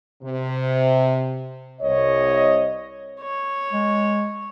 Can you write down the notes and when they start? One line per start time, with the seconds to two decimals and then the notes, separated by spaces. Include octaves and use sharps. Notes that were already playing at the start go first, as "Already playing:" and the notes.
0.22 C3
1.81 C2 C#5 D#5
3.21 C#5
3.72 G#3